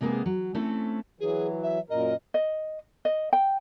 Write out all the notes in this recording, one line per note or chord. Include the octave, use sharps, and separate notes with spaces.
C3 G#3 A#3 B3 G#4
F#3
A3 C4 C#4 E4 A4
E3 F#3 G#4
E5
F#2 A#2 A#4 D#5
D#5
D#5
G5